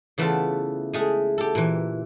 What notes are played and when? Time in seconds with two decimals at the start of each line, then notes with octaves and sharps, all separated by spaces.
0.18 C#3 E3 A3 B3 F4 A4
0.93 G#3 A3 G#4
1.38 G4 A4
1.55 A#2 E3